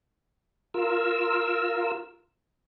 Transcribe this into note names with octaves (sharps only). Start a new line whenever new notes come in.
F4 A#4 E6